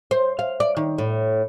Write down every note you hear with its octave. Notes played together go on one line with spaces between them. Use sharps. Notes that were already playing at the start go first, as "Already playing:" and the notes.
C5
F5
D5
D#3
A2